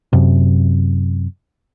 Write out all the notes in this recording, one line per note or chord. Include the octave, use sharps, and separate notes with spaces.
F#2 C3